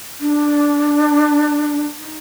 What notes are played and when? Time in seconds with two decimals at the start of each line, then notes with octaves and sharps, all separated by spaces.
0.20 D4
2.00 D#4